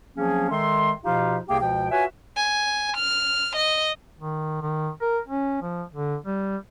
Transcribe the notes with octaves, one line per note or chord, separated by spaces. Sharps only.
F3 F#3 A#3 C4 C#4 G#4
D#3 G#3 A4 E5 C6
B2 F3 D#4 F4 G4 F5
C2 C3 A#3 G4 G#4 G5
C#2 B2 F3 G5
F4 F#4 B4 C#5 E5 G#5
G#5
F6
D#5
D#3
D#3
A#4
C#4
F3
D3
G3